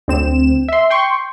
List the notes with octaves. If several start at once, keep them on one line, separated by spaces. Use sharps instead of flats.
D2 C4 E7
E5 C6
G5 C6 C#6